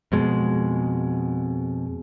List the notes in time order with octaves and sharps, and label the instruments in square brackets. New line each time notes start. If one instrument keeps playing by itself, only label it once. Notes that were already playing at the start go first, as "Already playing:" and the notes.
[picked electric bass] F2 B2 G#3